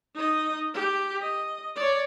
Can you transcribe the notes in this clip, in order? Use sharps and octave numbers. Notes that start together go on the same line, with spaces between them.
D#4 D#5
G4
D#5
C#5 D5